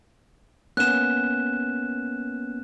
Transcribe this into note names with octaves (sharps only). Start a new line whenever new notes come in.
A#3 B3 C#4 F#6 E7